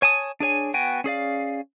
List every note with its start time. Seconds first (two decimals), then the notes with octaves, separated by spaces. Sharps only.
0.02 C#5 G#5 A5 D#6
0.40 D4 G#4 C#5 G#5
0.74 B3 F#4 G5 G#5
1.04 C#4 G#4 D5 F5